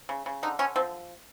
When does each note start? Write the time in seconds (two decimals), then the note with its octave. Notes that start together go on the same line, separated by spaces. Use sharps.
0.09 C#3
0.26 C#3
0.43 D3 D#4
0.59 D3 C#4
0.76 F3 C4